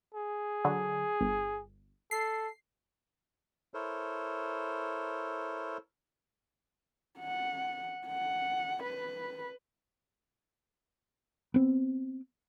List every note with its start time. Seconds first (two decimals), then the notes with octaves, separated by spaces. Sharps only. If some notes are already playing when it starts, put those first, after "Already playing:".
0.14 G#4
0.65 D3 F#3
1.21 G1
2.11 A4 C7
3.74 E4 A4 A#4 C5 C#5
7.19 F#5
8.07 F#5
8.83 B4
11.54 B3 C4